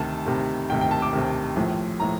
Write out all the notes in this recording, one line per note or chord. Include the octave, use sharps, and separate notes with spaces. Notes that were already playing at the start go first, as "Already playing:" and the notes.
Already playing: D2 C3 D#3 A5
D2 C3 D#3
D2 C3 D#3 G5
G5
A5
D6
D2 C3 D#3
A#1 A2 F3
A2 F3 A#5